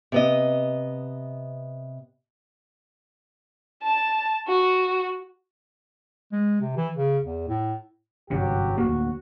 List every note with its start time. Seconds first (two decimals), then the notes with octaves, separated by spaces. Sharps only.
0.12 C3 B3 D#5
3.83 A5
4.48 F#4
6.32 G#3
6.61 C3
6.77 E3
6.96 C#3
7.24 E2
7.48 A2
8.30 G1 F#2 C3 F#3 F#4 G4
8.78 D1 G#1 A#3 F#4